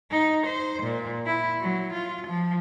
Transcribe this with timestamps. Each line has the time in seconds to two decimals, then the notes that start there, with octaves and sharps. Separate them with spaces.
0.11 D#4
0.46 C5
0.83 A#2
1.26 E4
1.61 F#3
1.93 F4
2.27 F3